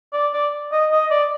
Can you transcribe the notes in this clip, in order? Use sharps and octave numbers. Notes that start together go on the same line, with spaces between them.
D5
D5
D#5
D#5
D5